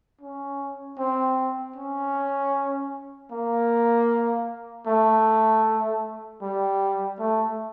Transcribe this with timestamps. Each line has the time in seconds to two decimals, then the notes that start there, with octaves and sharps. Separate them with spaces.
0.21 C#4
0.98 C4
1.76 C#4
3.31 A#3
4.87 A3
6.41 G3
7.19 A3